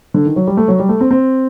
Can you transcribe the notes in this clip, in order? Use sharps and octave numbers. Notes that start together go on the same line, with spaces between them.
D3
D#3
F#3
G3
A3
F#3
G3
A3
C4
C4